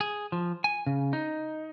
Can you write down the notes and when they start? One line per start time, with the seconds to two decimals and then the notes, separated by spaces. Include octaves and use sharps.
0.01 G#4
0.32 F3
0.64 G#5
0.87 C#3
1.13 D#4